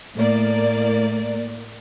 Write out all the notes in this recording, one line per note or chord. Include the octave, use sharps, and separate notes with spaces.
A2 A#3 D5